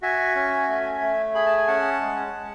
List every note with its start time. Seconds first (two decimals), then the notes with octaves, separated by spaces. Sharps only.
0.02 F#4 E5 G#5
0.35 C#4
0.68 A3
1.01 A3
1.35 G#4 B5
1.46 A5
1.57 G#5
1.68 C#4 F#5 A5
2.01 G#3
2.33 G#3